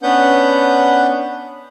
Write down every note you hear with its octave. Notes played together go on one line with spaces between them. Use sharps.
B3 C#4 D4 B4 F#5 G6